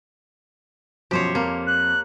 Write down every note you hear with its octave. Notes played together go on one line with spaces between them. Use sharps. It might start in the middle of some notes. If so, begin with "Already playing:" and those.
F#2 B2 F3 G4 C5 C#5
F2 A#3
F#6